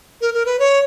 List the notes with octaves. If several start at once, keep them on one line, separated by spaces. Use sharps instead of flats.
A#4
A#4
B4
C#5